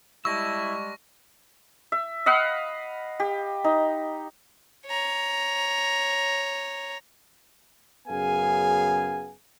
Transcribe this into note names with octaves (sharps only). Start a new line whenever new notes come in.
G3 G#3 E4 A5 C#6 E6 A#6
E5
D#5 F5 F#5 B5
G4
D#4
C#5 A#5
F#2 C#3 B3 G#4 F5 G#5